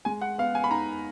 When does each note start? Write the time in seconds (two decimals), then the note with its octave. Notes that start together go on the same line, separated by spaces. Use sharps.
0.05 G#3 G#5
0.22 F#5
0.38 B3 F5
0.55 G#5
0.64 B5
0.71 D#4 A#5